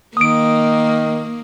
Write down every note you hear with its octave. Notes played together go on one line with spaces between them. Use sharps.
D#3 A#3 D#6 D7